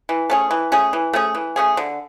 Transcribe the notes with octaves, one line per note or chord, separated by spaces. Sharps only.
E3
A3 C#4 G#4
E3
A3 C#4 G#4
E3
A3 C#4 G#4
E3
A3 C#4 G#4
D3